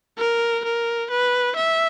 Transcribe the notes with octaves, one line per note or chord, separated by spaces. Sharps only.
A#4
A#4
B4
E5